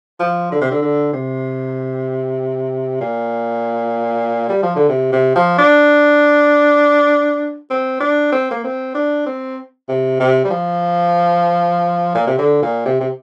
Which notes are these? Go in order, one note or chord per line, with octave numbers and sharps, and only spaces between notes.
F3
D3
C3
D3
D3
C3
A#2
G3
F3
D3
C3
C3
F3
D4
C4
D4
C4
A#3
C4
D4
C4
C3
C3
G3
F3
A#2
C3
D3
A#2
C3
C3